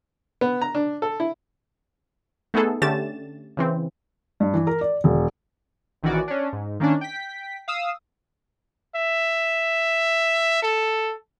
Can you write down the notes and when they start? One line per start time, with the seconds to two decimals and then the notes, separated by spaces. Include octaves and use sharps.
0.41 B3
0.62 A#5
0.75 D4
1.02 A4
1.20 E4
2.54 A3 B3 D#4 G#4 A4
2.82 D3 A3 C#4 G4 A6 E7
3.57 C#3 E3 C4
4.40 G2
4.54 E3
4.67 A#4
4.81 D5
5.04 E1
6.03 A#1 D#3 E3 C#4 F#4 D5
6.28 C#4 D4
6.53 G#2
6.80 D#3 A#3 C#4 D4
7.01 G5 B6
7.68 F5 D#6 E6
8.96 E5
10.63 A4